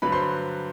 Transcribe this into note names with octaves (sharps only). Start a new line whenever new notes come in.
G2 D3 F#3 B4 B5
C5 C6